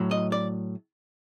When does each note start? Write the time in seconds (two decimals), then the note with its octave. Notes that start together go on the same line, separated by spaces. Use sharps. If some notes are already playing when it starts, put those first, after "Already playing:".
Already playing: A2 F#3
0.11 D#5
0.32 D5